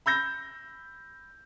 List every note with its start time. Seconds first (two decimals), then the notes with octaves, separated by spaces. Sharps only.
0.06 B5 E6 G6 A#6